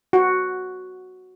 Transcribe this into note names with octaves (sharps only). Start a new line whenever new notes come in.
F#4